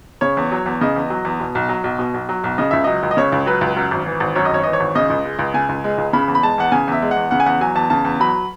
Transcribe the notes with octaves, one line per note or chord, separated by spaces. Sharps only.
C#3 C#5
E2
F#3
E2
C#3 D#5
E2
F#3
E2
B2
B1
F#3
B1
B2
B1
F#3
B1
C#3 D#5
C#2 E5
F#3 D#5
C#2
D#5
C#3 C#5
C#2
F#3 B4
C#2
F#2
G#1
E3
G#1
F#2 C#5
D#5
G#1 C#5
E3 D#5
C#5
G#1
C#3 D#5
C#2
G#3
C#2
C#3 G#5
C#2
G#3
C#2
C#3 B5
E2
B5
G#3 A5
E2 F#5
C#3 G#5
E2 E5
G#3
F#5
E2
C#3 F#5
G#5
E2 F#5
F#3 G#5
E2 A5
C#3 A5
E2
F#3 B5